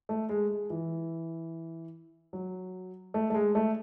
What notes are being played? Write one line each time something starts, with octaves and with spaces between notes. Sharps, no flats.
A3
G#3
G#3
E3
F#3
A3
A3
G#3
A3